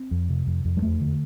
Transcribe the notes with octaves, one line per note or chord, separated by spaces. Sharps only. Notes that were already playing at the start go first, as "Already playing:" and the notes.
Already playing: C4
F2
C3
F2
F2
G3
E2 A3
D3